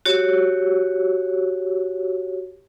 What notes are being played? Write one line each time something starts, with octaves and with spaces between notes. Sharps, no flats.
F#4 G4 C#5